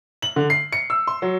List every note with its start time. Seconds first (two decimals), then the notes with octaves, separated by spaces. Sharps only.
0.22 F#7
0.36 D3
0.50 C7
0.73 C#7
0.90 E6
1.07 C6
1.22 F#3